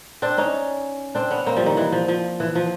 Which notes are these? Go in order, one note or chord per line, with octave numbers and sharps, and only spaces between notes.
C4 D4
C#4 D#4
C4 D4
B3 C#4
A#3 C4
F3 G3
D#3
E3
F3
F3
E3
F3